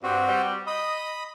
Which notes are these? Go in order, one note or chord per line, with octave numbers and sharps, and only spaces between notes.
G2 C4 F#4
G3
D#5 B5 D#6